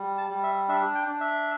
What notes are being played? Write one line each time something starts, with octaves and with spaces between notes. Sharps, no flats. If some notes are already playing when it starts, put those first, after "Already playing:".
Already playing: G3
A5
G3
E5
D4 E5
G5
D4
E5